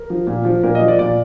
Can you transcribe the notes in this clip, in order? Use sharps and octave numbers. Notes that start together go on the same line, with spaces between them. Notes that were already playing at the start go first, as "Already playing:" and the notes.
Already playing: A#4
F3
A#2
F3
A#2 A#4
D#5
F3
D5
A#2 D5